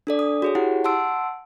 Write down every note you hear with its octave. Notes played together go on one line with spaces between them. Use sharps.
D4 A4 D5
D#6
F#4 G#4 C#5
E4 G4 F#5
F#5 A5 C6 E6 D7